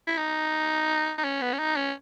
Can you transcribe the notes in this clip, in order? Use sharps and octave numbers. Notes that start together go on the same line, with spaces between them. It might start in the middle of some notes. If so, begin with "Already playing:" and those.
E4
D#4
D#4
C#4
B3
C#4
D#4
C#4